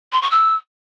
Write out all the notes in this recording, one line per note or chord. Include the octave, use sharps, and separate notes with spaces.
C6
C#6
E6